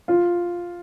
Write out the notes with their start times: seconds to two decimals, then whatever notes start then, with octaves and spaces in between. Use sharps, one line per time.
0.08 F4